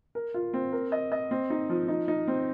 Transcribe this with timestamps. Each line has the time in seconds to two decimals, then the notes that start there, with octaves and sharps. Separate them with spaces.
0.15 A#4
0.34 F4
0.54 C4
0.73 A#4
0.92 D#5
1.12 D#5
1.31 C4
1.50 D#4
1.70 F3
1.88 D#4
2.08 D#4
2.28 C4